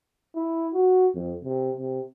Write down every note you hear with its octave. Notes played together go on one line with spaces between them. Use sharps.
E4
F#4
F2
C3
C3